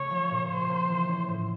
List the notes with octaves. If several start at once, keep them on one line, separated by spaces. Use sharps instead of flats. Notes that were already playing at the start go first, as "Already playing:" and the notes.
Already playing: C#3 A3 C#5
F3
A#2
A#2 C5
A#3
E3
C#4
A2